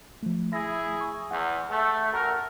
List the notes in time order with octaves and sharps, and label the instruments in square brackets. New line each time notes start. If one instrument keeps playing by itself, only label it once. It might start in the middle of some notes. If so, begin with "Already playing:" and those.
[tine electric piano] F3 A3
[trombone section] E4 G#4 [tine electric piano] A#6
[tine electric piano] C#6
[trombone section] E2 [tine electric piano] F#5
[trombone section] A3
A1 F#4 A#4